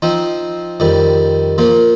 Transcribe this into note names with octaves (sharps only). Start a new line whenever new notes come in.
F3 C4 D#4
F2 D#3 G3
A#2 F3 A#3 F4